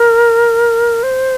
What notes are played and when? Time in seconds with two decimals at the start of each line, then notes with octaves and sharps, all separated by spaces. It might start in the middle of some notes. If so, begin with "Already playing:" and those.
Already playing: A#4
1.03 C5